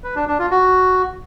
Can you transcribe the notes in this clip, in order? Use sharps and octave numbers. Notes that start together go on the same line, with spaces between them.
B4
D4
D4
F4
F#4